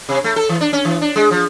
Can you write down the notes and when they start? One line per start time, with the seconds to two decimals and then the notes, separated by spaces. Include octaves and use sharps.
0.09 C3
0.24 A3
0.36 A4
0.49 E3
0.61 D4
0.73 C#4
0.85 E3
1.01 D4
1.16 G#3
1.31 F3